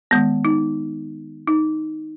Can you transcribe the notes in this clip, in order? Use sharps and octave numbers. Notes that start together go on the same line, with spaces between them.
D#3 G#3 B3
D#4
D#4